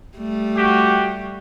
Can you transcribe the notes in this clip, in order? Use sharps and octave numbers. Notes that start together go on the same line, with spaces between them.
G3 A3
F#4 G4